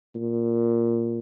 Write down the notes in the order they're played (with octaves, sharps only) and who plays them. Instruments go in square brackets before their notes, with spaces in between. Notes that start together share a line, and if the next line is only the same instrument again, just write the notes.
[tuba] A#2